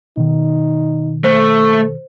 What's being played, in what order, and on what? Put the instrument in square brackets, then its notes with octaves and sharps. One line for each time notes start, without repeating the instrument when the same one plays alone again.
[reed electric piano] B2 D#3 [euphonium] D#4
[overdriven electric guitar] A3 [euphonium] A4 [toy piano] C5